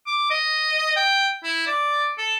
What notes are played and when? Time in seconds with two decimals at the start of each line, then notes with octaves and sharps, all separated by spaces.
0.06 D6
0.30 D#5
0.96 G5
1.44 E4
1.67 D5
2.18 A4